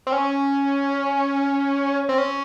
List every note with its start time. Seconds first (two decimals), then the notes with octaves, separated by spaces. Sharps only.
0.07 C4
0.12 C#4
2.09 C4
2.18 C#4